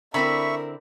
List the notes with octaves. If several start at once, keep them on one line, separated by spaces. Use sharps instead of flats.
D3 C4 E4 A#4 E5 B5 C#6